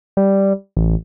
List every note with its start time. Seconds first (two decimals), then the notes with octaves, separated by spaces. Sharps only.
0.17 G3
0.77 A1